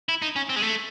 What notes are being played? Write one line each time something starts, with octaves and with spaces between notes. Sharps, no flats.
E4
D#4
C#4
C4
G#3
A3